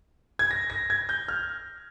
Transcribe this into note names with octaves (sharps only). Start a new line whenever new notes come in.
G#6
A#6
A#6
G#6
G6
F6